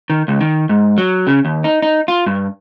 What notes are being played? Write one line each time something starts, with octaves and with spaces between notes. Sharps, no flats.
D#3
C#2
D#3
G#2
F#3
C#3
D#2
D#4
D#4
F4
G2